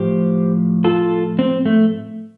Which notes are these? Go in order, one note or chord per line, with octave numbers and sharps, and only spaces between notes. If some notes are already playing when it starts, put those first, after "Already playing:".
Already playing: A2 F3 G4 C5
F4 A4
C4
A3